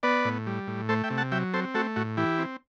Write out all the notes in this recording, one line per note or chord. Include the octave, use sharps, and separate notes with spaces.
B3 B4 D5
A2
G3
A2
A3 A4 C5
E5 G5
C3
F#5 A5
F#3 E5 G5
C4 A4 C5
A3 F#4 A4
A2 F#4
E3 E4 G4
C4